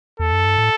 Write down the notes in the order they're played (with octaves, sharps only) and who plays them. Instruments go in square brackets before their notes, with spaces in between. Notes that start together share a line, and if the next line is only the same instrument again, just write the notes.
[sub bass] E2 [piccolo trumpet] A4
[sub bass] F#2
G2
A2